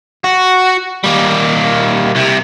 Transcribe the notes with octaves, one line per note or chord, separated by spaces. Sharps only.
F#4
G3 A#3
C2 C3